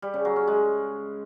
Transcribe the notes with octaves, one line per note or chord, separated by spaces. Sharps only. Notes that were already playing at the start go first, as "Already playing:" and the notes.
G3
C#3
F#3
C#4
G#3